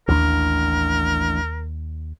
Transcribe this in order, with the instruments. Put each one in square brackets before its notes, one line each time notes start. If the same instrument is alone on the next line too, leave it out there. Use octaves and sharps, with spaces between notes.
[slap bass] A1 D4 [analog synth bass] D#2 [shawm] A#4